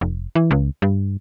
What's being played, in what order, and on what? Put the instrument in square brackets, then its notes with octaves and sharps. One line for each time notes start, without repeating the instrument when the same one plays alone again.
[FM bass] F1
E3
C#2
G2